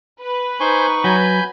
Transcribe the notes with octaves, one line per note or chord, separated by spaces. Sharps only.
B4
D#4 C5 G#5 C#6 G6
F#3 G#5 B5 G6